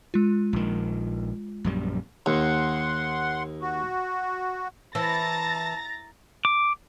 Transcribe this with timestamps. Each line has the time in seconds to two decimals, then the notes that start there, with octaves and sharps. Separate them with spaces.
0.14 G#3 F4
0.53 A#1 D#3
1.64 A#1 F#2 G3
2.26 D#2 F#5 C6
3.61 F#4
4.95 E3 A5 A#5 A6 A#6
6.45 D6